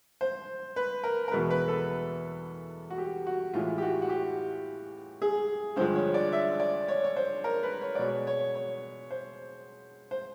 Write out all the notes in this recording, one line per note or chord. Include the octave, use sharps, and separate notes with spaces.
C5
B4
A#4
A#4
E2 B2 G#3 B4
B4
A4
F#4
G4
F#4
A2 E3 G#3 F4
G4
F#4
F#4
G4
G#4
G2 D3 F3 G#3 C5
C#5
D5
E5
D5
C#5
C#5
C5
A#4
B4
C#5
D5
B2 G#3 C#5
C#5
C#5
C5
C5